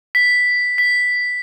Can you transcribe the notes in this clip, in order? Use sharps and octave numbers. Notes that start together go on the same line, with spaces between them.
B6
B6